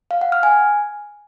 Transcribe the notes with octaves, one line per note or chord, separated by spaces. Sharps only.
F5
F#5
F6
G#5